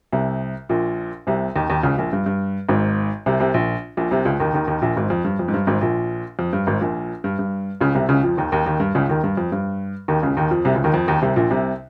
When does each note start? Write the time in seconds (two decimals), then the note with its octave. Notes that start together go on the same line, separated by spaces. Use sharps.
0.13 C2 C3
0.69 A#1 A#2
1.27 C2 C3
1.56 D#2 D#3
1.70 D#2 D#3
1.83 C#2 C#3
1.98 A#1 A#2
2.13 G2
2.26 G2
2.69 G#1 G#2
3.26 C2 C3
3.40 C2 C3
3.54 A#1 A#2
3.97 A#1 A#2
4.11 C2 C3
4.25 C#2 C#3
4.40 D#2 D#3
4.54 D#2 D#3
4.68 D#2 D#3
4.82 A#1 A#2
4.96 G#1 G#2
5.10 F2
5.25 G2
5.39 F2
5.48 G#2
5.54 G2
5.67 G#1 G#2
5.81 A#1 A#2
6.39 F2
6.53 G2
6.67 G#1 G#2
6.81 A#1 A#2
7.24 G2
7.39 G2
7.81 C#2 C#3
7.95 C2 C3
8.09 C#2 C#3
8.23 F2 F3
8.37 D#2 D#3
8.51 D#2 D#3
8.66 D#2 D#3
8.80 G2
8.95 C#2 C#3
9.09 D#2 D#3
9.24 G2
9.37 F2
9.52 G2
10.08 D#2 D#3
10.22 C#2 C#3
10.37 D#2 D#3
10.51 F2 F3
10.65 C2 C3
10.75 C#2 C#3
10.84 D#2 D#3
10.94 F2 F3
11.07 D#2 D#3
11.22 C2 C3
11.36 A#1 A#2
11.51 C2 C3